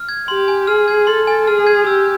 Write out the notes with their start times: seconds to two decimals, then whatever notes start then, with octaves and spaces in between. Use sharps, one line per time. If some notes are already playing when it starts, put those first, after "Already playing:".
Already playing: F6
0.09 G#6
0.28 G4 C6
0.48 G#5
0.67 G#4 F6
0.88 G#6
1.07 A4 C6
1.27 G#5
1.47 G#4 F6
1.67 G#6
1.86 G4 E6